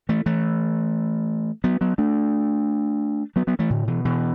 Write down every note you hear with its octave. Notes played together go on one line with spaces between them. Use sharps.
E3 A3
E3 A3
F#3 B3
F#3 B3
A3 D4
F#3 B3
F#3 B3
E3 A3
A2 D3
B2 E3
B2 E3